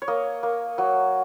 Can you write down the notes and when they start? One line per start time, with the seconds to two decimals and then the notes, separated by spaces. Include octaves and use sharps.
0.02 C#5
0.08 A#3 D#5
0.43 A#3
0.78 F#3